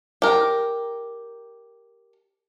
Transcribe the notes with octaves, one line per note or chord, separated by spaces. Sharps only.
G4 A#4